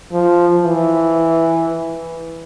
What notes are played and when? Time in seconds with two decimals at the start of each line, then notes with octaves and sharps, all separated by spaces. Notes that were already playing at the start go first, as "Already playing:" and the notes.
0.12 F3
0.63 E3